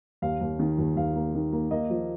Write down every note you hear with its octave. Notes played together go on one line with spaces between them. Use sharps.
D#2 F5
D#2
D#3
D#2
D#2 F5
A#3
D#3
A#3
A#3 D#5
F3